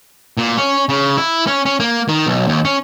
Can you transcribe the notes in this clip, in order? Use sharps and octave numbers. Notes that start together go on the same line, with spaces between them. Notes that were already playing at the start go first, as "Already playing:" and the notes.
A#2
C#4
C#3
E4
C#4
C#4
A#3
D#3
B1
D#2
C#4